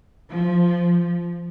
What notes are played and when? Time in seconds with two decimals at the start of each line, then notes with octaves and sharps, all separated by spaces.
0.32 F3